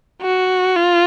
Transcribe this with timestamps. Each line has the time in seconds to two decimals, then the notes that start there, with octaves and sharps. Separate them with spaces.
0.22 F#4
0.76 F4